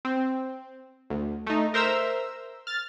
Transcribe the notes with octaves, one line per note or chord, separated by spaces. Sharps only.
C4
D2
A3 D#4
A#4 C5 E5 A#5 E6
F6 A6